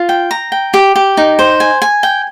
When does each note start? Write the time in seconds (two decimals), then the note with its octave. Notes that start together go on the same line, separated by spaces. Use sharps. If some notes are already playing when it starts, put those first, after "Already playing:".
Already playing: F4
0.09 G5
0.31 A#5
0.52 G5
0.74 G4
0.96 G4
1.17 D#4
1.39 C5
1.60 G#5
1.82 G#5
2.03 G5